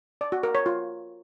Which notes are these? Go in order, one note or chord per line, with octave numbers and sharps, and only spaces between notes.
D5
F#4
A#4
C#5
F4